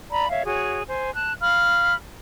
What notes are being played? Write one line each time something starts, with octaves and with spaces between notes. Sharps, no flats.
D5 A#5 B5
C#5 E5 F5
F#4 G#4 C#5
C5 G#5
A5 F#6
F5 B5 F6